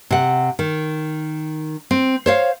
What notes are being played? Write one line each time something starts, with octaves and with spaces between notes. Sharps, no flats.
C3 F#5
D#3
C4
C5 C#5 F5